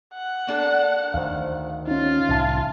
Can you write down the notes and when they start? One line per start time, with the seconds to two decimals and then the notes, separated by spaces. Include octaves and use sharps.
0.13 F#5
0.47 A#3 D4 A4
1.14 D2 D#3 C5 F5
1.88 C#4 D#4 F4
2.29 C2 A2 E3 E5 A5